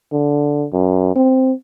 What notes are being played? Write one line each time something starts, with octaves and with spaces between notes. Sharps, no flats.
D3
F#2
C4